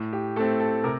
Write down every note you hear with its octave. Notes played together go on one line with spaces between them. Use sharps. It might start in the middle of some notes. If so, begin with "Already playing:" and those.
Already playing: A2
G4
A3 C4 A4
A4
C3 A#4